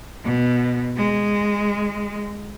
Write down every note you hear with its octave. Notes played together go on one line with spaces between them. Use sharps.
B2
G#3